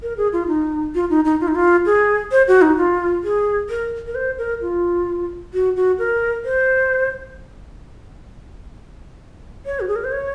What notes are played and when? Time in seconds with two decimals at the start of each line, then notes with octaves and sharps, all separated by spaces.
0.03 A#4
0.17 G#4
0.33 F4
0.48 D#4
0.95 F4
1.10 D#4
1.25 D#4
1.41 F4
1.48 D#4
1.55 F4
1.86 G#4
2.31 C5
2.48 F#4
2.62 D#4
2.77 F4
3.24 G#4
3.70 A#4
4.07 A#4
4.15 C5
4.38 A#4
4.62 F4
5.54 F#4
5.76 F#4
5.99 A#4
6.44 C5
9.66 C#5
9.80 F#4
9.88 G#4
9.96 A#4
10.04 C5
10.12 C#5